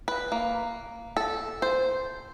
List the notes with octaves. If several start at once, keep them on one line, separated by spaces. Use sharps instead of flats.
B4
A#3
A4
C5